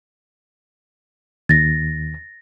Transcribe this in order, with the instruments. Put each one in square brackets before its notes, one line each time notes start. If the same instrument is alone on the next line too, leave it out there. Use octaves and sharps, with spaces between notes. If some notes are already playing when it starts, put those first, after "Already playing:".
[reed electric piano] D#2 [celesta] A6 A#6